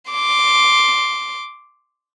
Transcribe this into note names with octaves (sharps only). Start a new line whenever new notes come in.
C6 D6